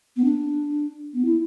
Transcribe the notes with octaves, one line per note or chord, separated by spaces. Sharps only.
B3
D4
B3
E4